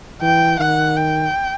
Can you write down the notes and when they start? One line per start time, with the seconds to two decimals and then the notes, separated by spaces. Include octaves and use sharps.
0.22 E3 G5
0.59 D#3 F#5
0.97 G5